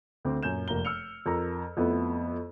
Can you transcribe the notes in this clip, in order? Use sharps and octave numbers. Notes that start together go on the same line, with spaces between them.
D2 C4 D6
F#2 A#2 G6 E7
F1 A#3 A#5 G7
E6 F6 C#7 F7
F2 A#4 A#5
F2 A3 B3 E4